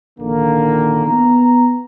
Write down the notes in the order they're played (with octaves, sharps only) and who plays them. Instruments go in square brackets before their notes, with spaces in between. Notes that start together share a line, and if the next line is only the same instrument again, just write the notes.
[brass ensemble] A#1 D3 D#3 A#3
B3 A#5